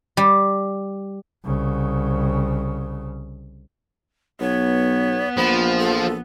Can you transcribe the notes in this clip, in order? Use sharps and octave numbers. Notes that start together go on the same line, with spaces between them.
G3
C2 C#3
B1 B3 C#5
A#1 F3 B5
A4